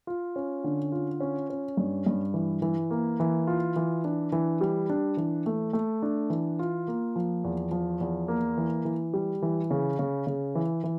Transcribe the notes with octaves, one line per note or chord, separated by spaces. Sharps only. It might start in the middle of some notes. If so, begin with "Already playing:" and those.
F4
C#4
D3
F4
C#4
C#4
G2
G2
E3
E3
A#3
E3
F4
E3
D4
E3
G3
D4
E3
A3
A3
D4
E3
F4
A#3
F3
E2
F3
E2
A#3
E3
E3
G3
E3
C#3
C#3
C#3
E3
E3